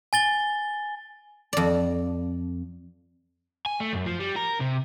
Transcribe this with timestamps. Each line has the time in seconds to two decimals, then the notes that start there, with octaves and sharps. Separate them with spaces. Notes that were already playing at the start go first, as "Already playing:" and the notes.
0.13 G#5 A6 G7
1.53 F2 D5
3.66 G#5
3.80 A3
3.93 F#2
4.06 F3
4.19 G3
4.36 A#4
4.60 C3